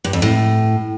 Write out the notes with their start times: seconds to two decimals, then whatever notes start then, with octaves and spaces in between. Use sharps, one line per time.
0.04 G2
0.13 F2
0.22 A2